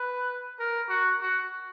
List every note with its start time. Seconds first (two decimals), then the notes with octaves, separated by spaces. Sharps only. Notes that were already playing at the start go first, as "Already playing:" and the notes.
Already playing: B4
0.59 A#4
0.89 F#4
1.21 F#4